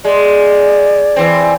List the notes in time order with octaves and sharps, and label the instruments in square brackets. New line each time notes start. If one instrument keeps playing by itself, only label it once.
[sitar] G#3 [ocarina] D5
[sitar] E3 C4